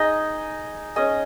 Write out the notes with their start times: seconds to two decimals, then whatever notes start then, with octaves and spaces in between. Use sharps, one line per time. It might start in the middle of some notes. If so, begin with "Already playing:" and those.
Already playing: D#4 G#4 D#5
0.96 C#4 G#4 D#5